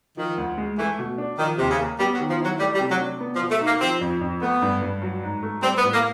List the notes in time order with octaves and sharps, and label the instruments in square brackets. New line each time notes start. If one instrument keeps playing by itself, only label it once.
[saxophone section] D#3 [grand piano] F3
[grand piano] D2
G#3
[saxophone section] E3 [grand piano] A3
[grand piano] B2
D4
[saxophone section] D#3 [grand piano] F3
[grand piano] D#2 [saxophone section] C3
[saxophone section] C#3
[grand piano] A#3
[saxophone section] G3 [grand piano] B3
[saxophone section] F#3
[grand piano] D#3
[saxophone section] F3
[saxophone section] F#3 [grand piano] E4
[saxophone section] G3 [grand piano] A3
[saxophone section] G3
[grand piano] C3
[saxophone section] F#3
[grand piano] D4
B3
[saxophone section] F3
[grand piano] B2
[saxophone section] A3
[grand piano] D#4
[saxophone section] A#3
[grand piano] F3 [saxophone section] C4
[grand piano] F2
F2
[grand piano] A3 [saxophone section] B3
[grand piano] G2
G2
F#3
G#2
A3
[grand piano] G3 [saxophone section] C4
[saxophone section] B3
[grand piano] A2
[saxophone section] A#3